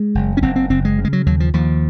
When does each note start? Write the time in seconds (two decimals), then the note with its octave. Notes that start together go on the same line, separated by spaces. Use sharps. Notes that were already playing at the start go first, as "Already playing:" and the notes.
Already playing: G#3
0.15 F#1
0.37 C#4
0.42 F#1 C4
0.56 C4
0.70 F#1 C4
0.85 G#3
0.98 C#3
1.05 G#3
1.13 F#3
1.26 D#2 F#3
1.40 F3
1.54 D#2 F3